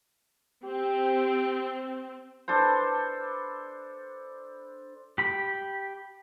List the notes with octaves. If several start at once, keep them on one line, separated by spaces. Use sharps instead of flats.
C4 G4
D4 A4 B4 C5
G4 B5